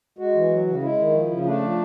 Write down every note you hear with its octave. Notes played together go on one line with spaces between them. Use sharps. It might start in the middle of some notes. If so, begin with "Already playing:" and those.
G#3 F#4
E3
F#3
C#3
G#3 E4
D#3
F3
C#3
A3 D4
F3